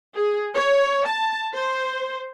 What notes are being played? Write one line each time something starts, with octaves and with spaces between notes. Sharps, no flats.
G#4
C#5
A5
C5